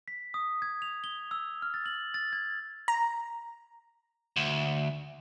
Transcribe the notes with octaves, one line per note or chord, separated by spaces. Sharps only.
B6
D#6
G#6
F7
G7
E6
F6
A6
F#7
A6
G#6
A#5
D2